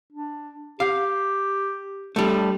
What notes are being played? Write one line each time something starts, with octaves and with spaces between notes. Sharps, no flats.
D4
G4 F5
G3 A3 D4